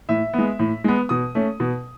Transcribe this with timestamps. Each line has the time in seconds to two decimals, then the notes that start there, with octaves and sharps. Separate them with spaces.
0.09 A2 E5
0.34 G#3 B3
0.59 A2
0.84 G#3 B3
1.09 B2 D#6
1.35 A3 C#4
1.60 B2